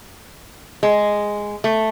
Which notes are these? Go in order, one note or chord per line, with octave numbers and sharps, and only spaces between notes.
G#3
A3